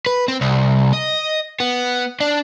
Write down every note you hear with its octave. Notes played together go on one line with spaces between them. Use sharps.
B4
C4
C2
D#5
B3
D4